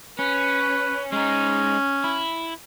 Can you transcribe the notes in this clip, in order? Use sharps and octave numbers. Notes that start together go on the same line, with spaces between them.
C#4 B4
G#3 C#4 D#4
E4